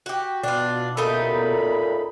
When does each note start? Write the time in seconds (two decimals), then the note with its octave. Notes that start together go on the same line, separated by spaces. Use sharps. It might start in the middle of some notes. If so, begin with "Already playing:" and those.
0.06 F#4 G4
0.43 B2 D4 F4
0.97 C#2 A#2 A3 D#4 B5